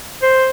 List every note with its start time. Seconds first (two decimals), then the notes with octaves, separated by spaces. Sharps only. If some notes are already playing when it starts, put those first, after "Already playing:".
0.22 C5